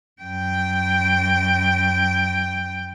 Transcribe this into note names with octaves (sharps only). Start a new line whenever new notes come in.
F#2 G5